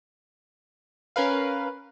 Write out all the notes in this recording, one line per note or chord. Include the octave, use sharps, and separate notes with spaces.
C#4 A#4 B4 F5